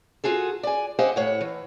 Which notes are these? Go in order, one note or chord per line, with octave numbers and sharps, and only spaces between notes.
F4 F#4 G#4 A4
D5 G#5
G4 C5 D#5 F5 F#5 G#5
A2 C#5 F#5
E3